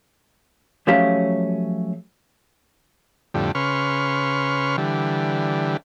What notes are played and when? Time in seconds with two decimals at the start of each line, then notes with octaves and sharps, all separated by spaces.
0.87 F3 F#3 A3 C#4 G4 F5
3.34 F2 A2 D3 G3
3.55 C#3 B4 C6 C#6 F6
4.78 D3 E3 G3